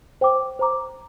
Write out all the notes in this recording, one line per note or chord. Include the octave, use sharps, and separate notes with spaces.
C5 G5 D6
C5 A#5 D6